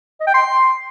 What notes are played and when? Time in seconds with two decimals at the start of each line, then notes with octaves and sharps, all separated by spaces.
0.20 D#5
0.27 G5
0.34 C6